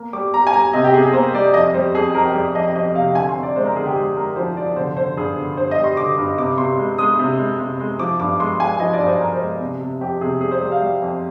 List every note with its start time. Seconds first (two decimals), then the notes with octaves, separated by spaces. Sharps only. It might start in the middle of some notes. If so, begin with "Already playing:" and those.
Already playing: A#3
0.13 G3 D6
0.34 G3 A#5
0.47 G#5
0.53 G3 A#5
0.73 C3 D#5
0.84 G4
0.93 C3 G#4
1.04 G#4
1.13 A#3 C5
1.34 G3 D5
1.54 F2 D#5
1.74 G3 C5
1.95 F2 G#4
2.14 F2 A#4
2.25 G4
2.35 G3 G#4
2.55 F2 D#5
2.75 F2 D#5
2.95 C3 F5
3.15 D3 G#5
3.29 C6
3.36 C4
3.43 D5
3.56 G#3 C5
3.66 A#4
3.76 D3 G#4
3.86 G4
3.96 G#3 G#4
4.16 G#3 A#4
4.36 F3 C5
4.56 F3 D5
4.76 D3 C5
4.96 D3 C5
5.17 G2 G#4
5.37 D3
5.57 G2 C5
5.71 D#5
5.78 G3
5.84 C6
5.97 D3 D6
6.18 G2
6.38 C3 D6
6.58 C3 C6
6.78 G#3
6.98 G#3 D#6
7.19 C3
7.38 G#3
7.59 C3
7.80 G#3
7.99 F3 D6
8.20 G2 D6
8.40 G#3 C6
8.60 G#3 G#5
8.80 F3 D#5
8.93 D5
8.99 G2
9.06 C5
9.20 G2 A#4
9.33 C5
9.40 G#3
9.60 C3
9.80 C3
10.01 F2 G4
10.21 C3 G#4
10.41 G3 G#4
10.51 C5
10.61 G3 G#4
10.72 F5
10.81 G3
11.01 F2